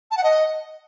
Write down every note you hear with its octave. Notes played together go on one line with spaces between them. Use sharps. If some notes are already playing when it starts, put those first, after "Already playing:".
A5
F#5
D#5